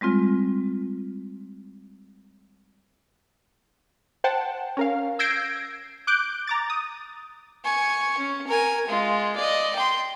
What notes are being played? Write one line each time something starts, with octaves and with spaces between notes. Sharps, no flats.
G3 G#3 C4 F4
C5 F#5 G5 A5
C#4 A#4 F5
E6 G6 G#6 A#6 C7 D7
D6 F#6 G6 D7
A#5 D6 A6
D#6
G#5 C#6
C#4
A#4 G#5
G#3 F4
D5 D#5
G5 C6